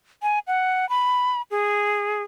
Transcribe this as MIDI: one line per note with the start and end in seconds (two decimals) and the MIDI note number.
0.22 0.39 80
0.47 0.88 78
0.89 1.42 83
1.51 2.23 68